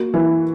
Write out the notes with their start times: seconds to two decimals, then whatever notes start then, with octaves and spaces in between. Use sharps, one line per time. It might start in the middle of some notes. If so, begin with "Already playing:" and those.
Already playing: A#3 F#4
0.14 E3